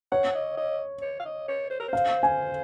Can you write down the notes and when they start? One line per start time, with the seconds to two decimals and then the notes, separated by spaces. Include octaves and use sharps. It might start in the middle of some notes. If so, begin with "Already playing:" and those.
0.12 C#5 F#5
0.35 D#5
0.57 D#5
1.02 C#5
1.20 F5
1.25 D#5
1.48 C#5
1.70 C5
1.80 A#4
1.88 C5 F5
2.23 G#5